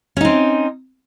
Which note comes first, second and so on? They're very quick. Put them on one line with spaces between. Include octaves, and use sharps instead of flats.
C#4 D#4 C4